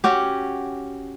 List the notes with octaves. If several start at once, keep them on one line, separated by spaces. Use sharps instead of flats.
C#4 F#4 G4